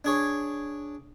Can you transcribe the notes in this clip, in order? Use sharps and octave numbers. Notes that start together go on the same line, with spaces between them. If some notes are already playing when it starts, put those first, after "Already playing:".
D4 G#4 C#5